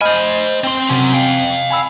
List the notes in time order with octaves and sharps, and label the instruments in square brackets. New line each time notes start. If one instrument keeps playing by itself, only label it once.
[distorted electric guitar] C5 G#5 [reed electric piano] D#5 B5 F6
[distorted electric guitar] C4 C6
[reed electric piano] C3 C4 [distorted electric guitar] F#3 C#4
[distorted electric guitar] F5 G5
[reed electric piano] G#5 B5 E6